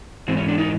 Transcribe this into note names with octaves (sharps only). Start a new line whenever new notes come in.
G#2 E3 C4
C#4
D4
D#4